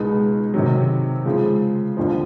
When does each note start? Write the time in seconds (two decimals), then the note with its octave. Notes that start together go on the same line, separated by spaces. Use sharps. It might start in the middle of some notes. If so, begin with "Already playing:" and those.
Already playing: C#2 B2 G#3 B3 D#4
0.54 C3 D#3 F#3
1.26 C#3 F3 G#3
1.97 D#2 D3 F3